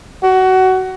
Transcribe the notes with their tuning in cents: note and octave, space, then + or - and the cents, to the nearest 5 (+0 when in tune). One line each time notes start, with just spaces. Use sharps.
F#4 +20